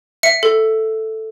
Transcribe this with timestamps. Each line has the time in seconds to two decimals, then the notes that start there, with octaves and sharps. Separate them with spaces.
0.23 E5 C#7
0.43 A4